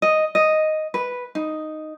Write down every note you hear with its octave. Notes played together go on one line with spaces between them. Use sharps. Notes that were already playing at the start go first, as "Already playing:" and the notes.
D#5
D#5
B4
D#4